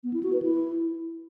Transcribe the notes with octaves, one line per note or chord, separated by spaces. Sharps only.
B3
E4
F#4
B4
E4